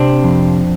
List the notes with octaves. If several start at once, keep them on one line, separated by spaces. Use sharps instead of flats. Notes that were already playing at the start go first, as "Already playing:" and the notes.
Already playing: C3 C4 D4
F2